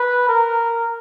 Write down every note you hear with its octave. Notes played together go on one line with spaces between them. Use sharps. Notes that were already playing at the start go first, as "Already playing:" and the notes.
Already playing: B4
A#4